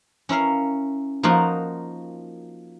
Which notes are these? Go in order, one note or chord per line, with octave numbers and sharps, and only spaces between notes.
C#4 E4 A#4 F5
F3 A#3 D#4 F4 F#4